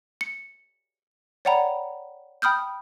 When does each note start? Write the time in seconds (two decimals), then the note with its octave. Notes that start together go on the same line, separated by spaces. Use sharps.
0.21 C#7
1.45 C#5 D5 F#5 G5 A#5 B5
2.42 G5 B5 D#6 F6 G6